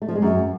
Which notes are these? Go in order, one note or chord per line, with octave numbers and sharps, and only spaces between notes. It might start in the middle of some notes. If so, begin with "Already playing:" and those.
A3
F3
G#3
F#2